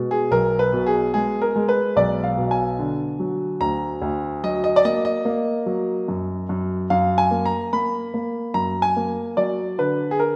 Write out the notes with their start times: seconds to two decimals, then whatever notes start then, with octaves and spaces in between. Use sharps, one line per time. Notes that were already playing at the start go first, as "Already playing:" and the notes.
Already playing: B2 G#3
0.11 G#4
0.31 B1 A#4
0.59 B4
0.73 B2
0.86 G#4
1.14 G#3 G#4
1.42 A#4
1.56 G#3
1.69 B4
1.96 B1 D5
2.24 F5
2.37 B2
2.51 G#5
2.79 D3
3.20 F#3
3.61 D2 A#5
4.02 D2
4.44 F#3 D#5
4.64 D#5
4.76 D5
4.85 A#3 D#5
5.05 D#5
5.25 A#3
5.66 F#3
6.08 F#2
6.49 F#2
6.90 F#2 F5
7.18 G#5
7.31 A#3
7.46 A#5
7.73 A#3 B5
8.14 A#3
8.54 F#2 A#5
8.82 G#5
8.97 A#3
9.37 F#3 D5
9.78 D3 B4
10.11 G#4
10.19 A#4